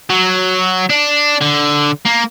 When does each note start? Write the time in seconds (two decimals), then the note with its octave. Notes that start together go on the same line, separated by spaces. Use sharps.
0.09 F#3
0.90 D4
1.42 D3
2.06 A#3